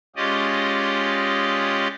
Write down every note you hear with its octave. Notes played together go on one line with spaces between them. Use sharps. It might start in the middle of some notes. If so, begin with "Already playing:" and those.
G#3 C#4 F4 G4 D5 D#5